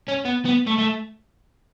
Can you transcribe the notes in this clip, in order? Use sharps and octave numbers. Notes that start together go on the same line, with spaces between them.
C#4
B3
B3
A3
A3